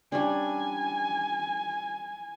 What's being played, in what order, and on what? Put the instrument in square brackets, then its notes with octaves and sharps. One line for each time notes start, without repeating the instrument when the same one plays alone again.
[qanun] G3 C#4 D4 [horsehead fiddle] G#5